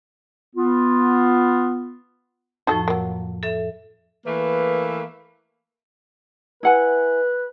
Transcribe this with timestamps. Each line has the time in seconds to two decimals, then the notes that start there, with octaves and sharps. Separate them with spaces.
0.55 B3 F4
2.67 F2 A2 F3 D#4 F#4 A4
2.88 F#3 A#3
3.43 A4 E5
4.26 E3 A3 A#3 B4
6.63 E4 B4 F#5 G#5